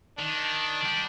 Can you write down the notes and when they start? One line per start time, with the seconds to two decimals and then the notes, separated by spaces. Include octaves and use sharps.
0.18 D#3 D4
0.86 G3